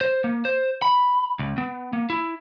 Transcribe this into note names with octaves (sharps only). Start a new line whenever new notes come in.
C5
A#3
C5
B5
C#2
B3
A#3
E4